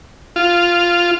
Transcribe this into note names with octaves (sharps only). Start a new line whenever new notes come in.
F4